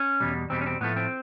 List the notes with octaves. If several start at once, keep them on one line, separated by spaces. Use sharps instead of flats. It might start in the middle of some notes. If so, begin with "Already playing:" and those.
Already playing: C#4
E2 B2 G3
E2 B2 G3 C4
C#4
C4
A2 F3 A3 B3
C4